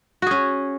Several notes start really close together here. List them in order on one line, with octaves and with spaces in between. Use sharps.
F#4 G#4 C#4